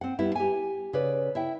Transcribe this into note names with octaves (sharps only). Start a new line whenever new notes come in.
C4 F#5
G3 B3 E4
G4 G#5
C#3 B4 D5
E4 E5 G5